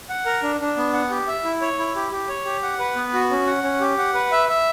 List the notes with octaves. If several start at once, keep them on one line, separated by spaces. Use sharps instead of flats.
F#5
A#4
D4
D4
B3
F#5
G4
E5
E4
C#5
E4
G4
G4
C#5
G4
F#5
B4
B3
F#4
C#4
F#5
C#4
G4
F#5
B4
E5
E5